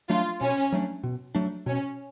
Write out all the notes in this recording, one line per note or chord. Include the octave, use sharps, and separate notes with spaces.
F#3 A3 D4 F4
B2 C#4
F#3 A3 D4
B2
F#3 A3 D4
B2 C#4